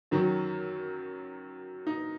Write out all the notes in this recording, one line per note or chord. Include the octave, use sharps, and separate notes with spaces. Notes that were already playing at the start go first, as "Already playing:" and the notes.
F#2 D#3 F#3
D#4